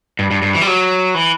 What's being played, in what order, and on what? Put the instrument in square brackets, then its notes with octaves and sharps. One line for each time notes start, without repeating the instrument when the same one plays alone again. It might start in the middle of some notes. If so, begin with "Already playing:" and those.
[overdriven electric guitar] G2
G2
G2
E3
G3
F#3
E3